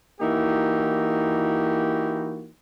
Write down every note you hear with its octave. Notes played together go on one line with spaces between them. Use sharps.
E3 A#3 D#4 E4 F#4 G4